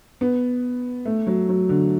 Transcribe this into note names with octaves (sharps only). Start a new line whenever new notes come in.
B3
A3
F#3
F#3
D3